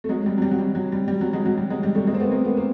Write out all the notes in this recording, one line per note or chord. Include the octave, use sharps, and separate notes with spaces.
A3
F#3 G#3
G3
F#3
G3
F#3
G3
F#3
G3
G3
F#3
F#3 G#3
F#3
G3
F#3 G#3
G3
G3 A3
G#3 A#3
C4
A3 B3
G#3 A#3
A3 B3
A#3 C4